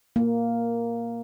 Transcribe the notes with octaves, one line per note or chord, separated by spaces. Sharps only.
A#3